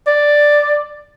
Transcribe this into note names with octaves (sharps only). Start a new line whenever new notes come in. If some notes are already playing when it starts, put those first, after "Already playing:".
D5